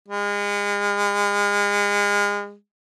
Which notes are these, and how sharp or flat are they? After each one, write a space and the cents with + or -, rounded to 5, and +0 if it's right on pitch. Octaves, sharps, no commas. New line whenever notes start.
G#3 -35